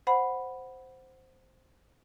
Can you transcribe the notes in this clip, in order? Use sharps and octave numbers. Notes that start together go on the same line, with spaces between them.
C5 F#5 B5